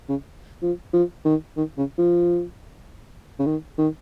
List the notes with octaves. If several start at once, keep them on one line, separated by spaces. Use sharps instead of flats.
C#3
F3
F3
D#3
D#3
C#3
F3
C#3
D#3
D#3